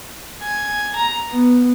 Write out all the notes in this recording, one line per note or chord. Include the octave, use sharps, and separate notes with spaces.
G#5
A#5
B3